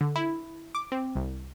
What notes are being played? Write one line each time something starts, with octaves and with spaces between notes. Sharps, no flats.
D3
E4
D6
C4
C2